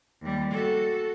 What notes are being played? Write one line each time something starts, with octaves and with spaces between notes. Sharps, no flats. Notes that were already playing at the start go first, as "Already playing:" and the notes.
D#2 G3
F#4 A4